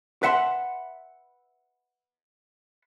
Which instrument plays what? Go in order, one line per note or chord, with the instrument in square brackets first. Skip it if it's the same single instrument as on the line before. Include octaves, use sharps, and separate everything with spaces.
[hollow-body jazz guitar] B4 E5 F#5 A5 C6